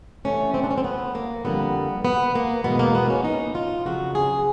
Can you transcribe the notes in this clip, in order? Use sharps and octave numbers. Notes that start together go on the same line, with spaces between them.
C3 E3 A3 C#4
C4
D4
C#4
C4
B3
A#3
F2 D3 G3 A#3 B3
B3
A#3
E2 B2 G#3 B3
A#3
B3
C#4
D#4
F4
F2 C#3 F#3 F#4
G#4